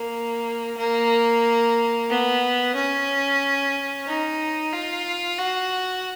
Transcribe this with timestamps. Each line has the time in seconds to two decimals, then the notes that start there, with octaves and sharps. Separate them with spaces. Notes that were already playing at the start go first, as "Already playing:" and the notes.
Already playing: A#3
0.78 A#3
2.10 B3
2.75 C#4
4.07 D#4
4.72 F4
5.39 F#4